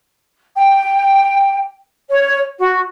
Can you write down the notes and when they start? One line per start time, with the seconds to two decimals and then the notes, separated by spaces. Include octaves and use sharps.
0.56 G5
2.10 C#5
2.58 F#4